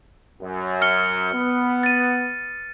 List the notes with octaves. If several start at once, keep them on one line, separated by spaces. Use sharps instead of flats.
F#2
F6 C#7 G7
B3
A6 D#7